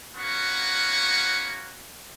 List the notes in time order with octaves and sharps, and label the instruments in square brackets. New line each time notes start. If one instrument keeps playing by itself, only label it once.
[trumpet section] A#3 B3 C#4 F#4 C#6